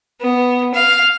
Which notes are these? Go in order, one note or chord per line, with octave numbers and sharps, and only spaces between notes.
B3
F5